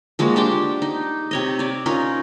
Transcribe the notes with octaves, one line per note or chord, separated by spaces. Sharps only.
F3 G#3 A#3 F#4
D4 G4 G5 A5
D#4
C3 C#5 D#5
C#5 D5
C#4 D#4 F4 A#4